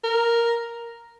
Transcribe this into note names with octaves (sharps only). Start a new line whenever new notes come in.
A#4